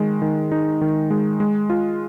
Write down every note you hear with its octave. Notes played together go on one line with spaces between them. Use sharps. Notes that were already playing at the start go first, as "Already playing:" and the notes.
Already playing: D#3 G#3
D#3
D#4
D#3
G#3
G#3
F4